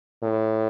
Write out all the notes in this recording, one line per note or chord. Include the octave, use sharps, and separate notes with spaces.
A2